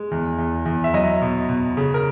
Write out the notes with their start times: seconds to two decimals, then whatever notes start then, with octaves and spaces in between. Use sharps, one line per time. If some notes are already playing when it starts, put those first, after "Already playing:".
Already playing: G#3
0.11 E2
0.38 E2
0.65 E2
0.84 E5
0.94 F#3 D#5
1.22 B2
1.49 B2
1.77 C#3
1.94 A#4